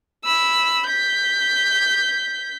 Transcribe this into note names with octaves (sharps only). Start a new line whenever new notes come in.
B5 E6
G6 B6